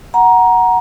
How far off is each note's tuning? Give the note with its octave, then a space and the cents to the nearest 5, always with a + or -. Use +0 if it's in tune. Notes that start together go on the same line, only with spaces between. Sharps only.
F#5 +0 A#5 +15